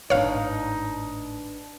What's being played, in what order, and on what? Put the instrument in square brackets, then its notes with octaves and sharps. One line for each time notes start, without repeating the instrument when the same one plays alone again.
[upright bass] G#1 A2 [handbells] D4 B4 [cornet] D#4 [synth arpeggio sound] C#5 F5